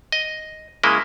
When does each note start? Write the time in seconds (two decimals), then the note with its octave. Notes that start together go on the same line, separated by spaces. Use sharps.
0.12 D#5
0.83 C#3 G#3 A#3 E4 D#5